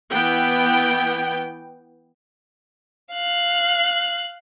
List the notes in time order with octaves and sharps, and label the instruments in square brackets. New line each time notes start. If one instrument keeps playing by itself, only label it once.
[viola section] E3 B3 G5
[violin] F5 F#6